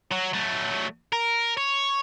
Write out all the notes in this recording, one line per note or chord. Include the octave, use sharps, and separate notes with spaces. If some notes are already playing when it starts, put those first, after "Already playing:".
F#3
F#3 A3
A#4
C#5